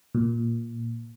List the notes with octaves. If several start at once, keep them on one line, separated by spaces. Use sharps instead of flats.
A#2